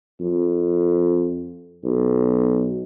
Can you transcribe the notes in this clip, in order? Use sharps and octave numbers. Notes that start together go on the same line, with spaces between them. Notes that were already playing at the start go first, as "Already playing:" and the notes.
F2
B1